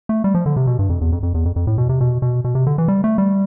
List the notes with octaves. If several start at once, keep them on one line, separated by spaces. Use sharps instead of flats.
A3
G3
F3
D3
C3
B2
G2
F2
E2
F2
F2
E2
F2
F2
A2
B2
C3
B2
B2
B2
C3
D3
E3
G3
A3
G3